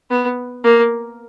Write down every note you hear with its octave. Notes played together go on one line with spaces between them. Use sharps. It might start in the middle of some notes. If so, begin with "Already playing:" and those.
B3
A#3